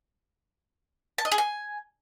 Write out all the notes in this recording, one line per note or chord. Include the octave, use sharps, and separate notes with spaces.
A5
D#5
G#4
G#5